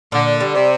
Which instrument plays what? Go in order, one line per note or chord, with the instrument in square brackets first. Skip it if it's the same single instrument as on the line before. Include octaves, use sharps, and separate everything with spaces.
[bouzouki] A#2 [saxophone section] D3
[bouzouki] G3
[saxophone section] C3